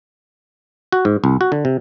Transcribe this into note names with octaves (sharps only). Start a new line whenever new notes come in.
F#4
G#2
C2
F#4
D3
C3